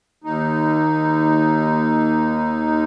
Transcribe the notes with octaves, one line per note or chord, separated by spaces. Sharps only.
D#2 D#4